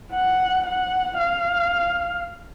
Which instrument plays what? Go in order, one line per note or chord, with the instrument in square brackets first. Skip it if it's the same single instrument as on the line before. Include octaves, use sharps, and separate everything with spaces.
[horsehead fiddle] F#5
F#5
F5